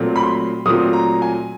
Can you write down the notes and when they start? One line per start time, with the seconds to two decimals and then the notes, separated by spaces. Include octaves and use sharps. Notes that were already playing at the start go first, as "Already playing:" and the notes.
Already playing: A#2 F#3 A3 C4
0.16 B5
0.23 C6
0.66 A#2 F#3 A3 C4 D#6
0.93 A#5
1.22 G#5